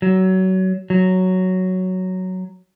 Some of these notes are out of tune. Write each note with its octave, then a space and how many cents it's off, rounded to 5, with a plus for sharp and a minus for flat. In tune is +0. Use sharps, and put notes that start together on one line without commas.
F#3 +25
F#3 +5